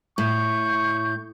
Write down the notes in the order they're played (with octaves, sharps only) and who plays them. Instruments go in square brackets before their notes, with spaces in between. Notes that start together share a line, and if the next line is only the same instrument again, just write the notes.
[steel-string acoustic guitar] A2 [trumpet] C#6 [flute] G6